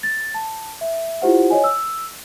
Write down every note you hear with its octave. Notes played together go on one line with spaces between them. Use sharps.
A6
A5
E5
E4 F4 G4 C5 F#5
C#5 D#5 G#5
E6